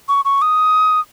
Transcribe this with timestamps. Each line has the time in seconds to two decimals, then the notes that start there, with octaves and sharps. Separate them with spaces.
0.09 C#6
0.25 C#6
0.42 D#6